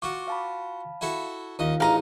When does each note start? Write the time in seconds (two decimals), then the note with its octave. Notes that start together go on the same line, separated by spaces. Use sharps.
0.02 F4 F#4 C#6 D6
0.28 F5 A5 B5
1.01 E4 F#4 A4
1.59 D#2 D#4 F4 D#5 F5
1.80 A1 D#4 E4 G#4 F5 A#5